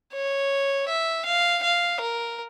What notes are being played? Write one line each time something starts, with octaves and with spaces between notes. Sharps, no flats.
C#5
E5
F5
F5
A#4